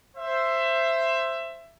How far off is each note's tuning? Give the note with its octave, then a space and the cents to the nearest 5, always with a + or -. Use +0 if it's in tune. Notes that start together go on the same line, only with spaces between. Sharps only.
C5 +5 E5 +15